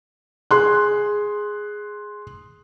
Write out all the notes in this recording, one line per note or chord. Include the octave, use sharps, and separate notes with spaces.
G#4 C6 F#6